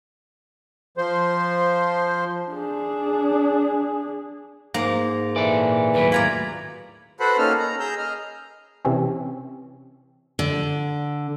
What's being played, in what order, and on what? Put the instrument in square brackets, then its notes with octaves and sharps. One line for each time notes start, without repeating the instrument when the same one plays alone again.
[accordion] F3 C5
[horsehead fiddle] D4 G#4
[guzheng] G#2 A#3 A#5
[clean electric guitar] A#2 A4 D5 [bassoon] E3
[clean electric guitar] D#2 A2 F#3 [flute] B4
[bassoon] F4 [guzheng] D5 A#5 B5 [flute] G#6
[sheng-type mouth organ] F#4 A4 B4 C5 F#5 B5
A#3 C#4 D#4 A4 F6
A#5
G#4 A#5 E6 G6
D#5 F6
[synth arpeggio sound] C3 E3 C4 C#4
[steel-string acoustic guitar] D3